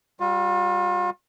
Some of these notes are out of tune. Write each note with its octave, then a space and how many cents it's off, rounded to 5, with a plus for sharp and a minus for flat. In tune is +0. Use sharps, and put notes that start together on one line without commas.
G3 +0 F4 +40